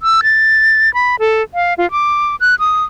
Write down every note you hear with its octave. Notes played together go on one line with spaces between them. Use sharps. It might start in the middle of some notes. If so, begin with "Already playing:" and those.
E6
A6
B5
A4
F5
F4
D6
F#6
D#6